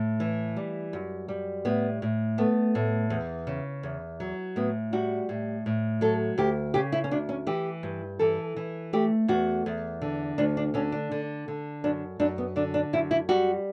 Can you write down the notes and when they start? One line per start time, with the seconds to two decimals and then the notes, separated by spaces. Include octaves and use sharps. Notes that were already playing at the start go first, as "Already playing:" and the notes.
Already playing: A2
0.20 E3
0.56 G3
0.93 F#2
1.28 G3
1.65 A2 B3
2.02 A2
2.38 A3 B3
2.75 A2
3.10 E2
3.47 C#3
3.83 E2
4.20 F#3
4.56 A2 B3
4.93 G3 F#4
5.29 A2
5.66 A2
6.01 F#3 A4
6.38 D2 G4
6.74 C#3 G4
6.92 E4
7.04 C#4
7.11 D2 D4
7.29 C#4
7.47 E3 G4
7.83 G2
8.19 E3 A4
8.56 E3
8.93 A3 G4
9.28 E2 F#4
9.66 E2
10.02 D3
10.38 D2 D4
10.57 D4
10.74 D3 C#4
10.92 D4
11.12 D3
11.48 D3
11.84 F#2 D4
12.19 F#2 D4
12.38 B3
12.56 D3 D4
12.74 D4
12.93 F#2 E4
13.11 E4
13.29 G3 F#4